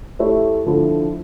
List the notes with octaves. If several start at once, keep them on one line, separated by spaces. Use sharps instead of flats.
A3 E4 G4 C#5 E5
D3 F3 A3 E4 A4